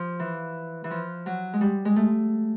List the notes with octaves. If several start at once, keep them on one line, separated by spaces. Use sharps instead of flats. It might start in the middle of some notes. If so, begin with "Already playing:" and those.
Already playing: F3
E3
E3
F3
F#3
G#3
G3
G#3
A3